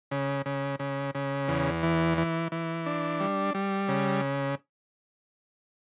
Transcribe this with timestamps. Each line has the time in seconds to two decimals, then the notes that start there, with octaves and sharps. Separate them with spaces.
0.11 C#3
0.46 C#3
0.80 C#3
1.15 C#3
1.48 E2
1.83 E3
2.18 E3
2.52 E3
2.86 D4
3.20 G3
3.54 G3
3.88 C#3